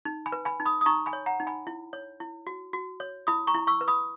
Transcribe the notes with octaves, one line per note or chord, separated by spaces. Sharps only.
D#4
G#5 B5
B4
G#5 B5
D#4
B5 D#6
D#6
D#4 A#5 C#6
G#5 B5
C#5
F#5 A#5
D#4
G#5 B5
E4
C#5
E4
F#4
F#4
C#5
E4 B5 D#6
A#5 C#6
E4
C#6 E6
B4
B5 D#6